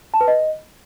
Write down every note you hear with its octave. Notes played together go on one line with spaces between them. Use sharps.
A5
B4
D#5